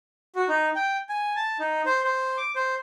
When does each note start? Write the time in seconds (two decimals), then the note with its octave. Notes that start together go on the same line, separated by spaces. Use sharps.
0.35 F#4
0.49 D#4
0.75 G5
1.09 G#5
1.36 A5
1.59 D#4
1.86 C5
2.04 C5
2.37 D6
2.56 C5